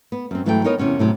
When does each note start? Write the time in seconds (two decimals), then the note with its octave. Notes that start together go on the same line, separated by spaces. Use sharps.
0.12 B3
0.31 F#2 C4
0.46 G#2 E3 F#3 A3 B4 G5
0.64 B3 D#4 A#4 C#5 D#5
0.78 E2 C3 C#4 F#5
0.99 A2 C3 F#3